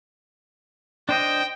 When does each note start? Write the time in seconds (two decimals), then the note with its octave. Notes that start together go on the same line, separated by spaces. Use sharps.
1.09 D4 C5 D#5 G5